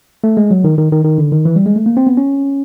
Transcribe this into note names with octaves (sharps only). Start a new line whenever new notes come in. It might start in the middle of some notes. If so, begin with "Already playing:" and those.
A3
G#3
F#3
D#3
D#3
D#3
D#3
D3
D#3
E3
G3
G#3
A3
A#3
C4
B3
C#4